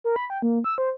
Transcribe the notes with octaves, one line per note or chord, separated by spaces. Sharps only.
A#4
B5
G5
A#3
E6
C5